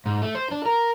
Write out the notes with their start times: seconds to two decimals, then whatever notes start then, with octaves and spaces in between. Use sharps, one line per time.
0.06 G#2
0.22 A3
0.35 C5
0.51 D4
0.66 A#4